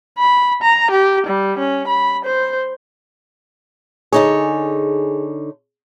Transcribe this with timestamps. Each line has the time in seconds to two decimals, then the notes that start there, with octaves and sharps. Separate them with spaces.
0.18 B5
0.62 A#5
0.91 G4
1.27 G3
1.59 C#4
1.88 B5
2.25 C5
4.13 D3 D#4 G#4 C#5